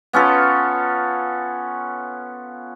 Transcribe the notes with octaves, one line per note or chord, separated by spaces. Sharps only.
B3 C#4 F4 A4